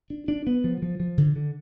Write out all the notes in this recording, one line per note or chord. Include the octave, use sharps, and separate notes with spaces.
D4
D4
B3
F3
F3
F3
D3
D3